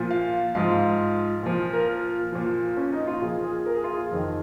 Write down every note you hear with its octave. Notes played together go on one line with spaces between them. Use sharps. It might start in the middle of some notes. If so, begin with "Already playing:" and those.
Already playing: A#2 F3
F5
G#2 F3 F5
A#2 F3
A#4
A#2 F3
C#4
D#4
F4
A#2 F3 G#4
G#4
A#4
G#4
F4
G#4
F2 D#3